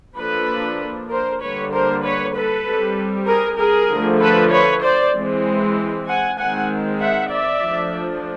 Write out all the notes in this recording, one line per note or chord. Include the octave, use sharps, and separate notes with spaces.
F3 A#3 D4 A4 B4
A#4 C5
D3 G3 A#3 B4 C#5
A#4 C5
B4 C#5
A4 B4
G3 C4
G#4 A#4
G#4 A#4
D3 F3 A3
A4 B4
B4 C#5
C5 D5
E3 G#3 C4
F#5 G#5
D#3 G#3 C4 F#5 G#5
E5 F#5
D5 E5
F3 A3 D4